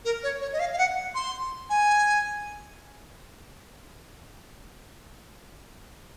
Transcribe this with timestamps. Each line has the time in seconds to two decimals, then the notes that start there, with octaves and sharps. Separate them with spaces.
0.05 A#4
0.23 C#5
0.41 C#5
0.53 D#5
0.60 F5
0.73 F5
0.78 F#5
1.15 C6
1.70 G#5